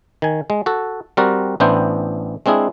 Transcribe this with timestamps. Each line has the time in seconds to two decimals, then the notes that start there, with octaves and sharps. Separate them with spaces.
0.22 D#3 G#5
0.50 G#3
0.66 F#4 A4
1.17 G3 C4 F#4 A#4 D5
1.60 A1 B3 D4 E4 C5 G5
2.46 G#3 C4 D4 E4 G#4